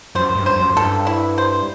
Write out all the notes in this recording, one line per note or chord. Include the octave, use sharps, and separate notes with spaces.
F#2 C5
G2
C5
F#2
G2 A4
E4
C5